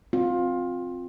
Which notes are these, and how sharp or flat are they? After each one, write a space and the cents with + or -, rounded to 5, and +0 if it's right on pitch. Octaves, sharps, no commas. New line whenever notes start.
C4 +0 F4 +20